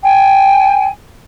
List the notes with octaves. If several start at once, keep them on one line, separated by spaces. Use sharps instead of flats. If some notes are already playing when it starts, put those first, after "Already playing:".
G5 G#5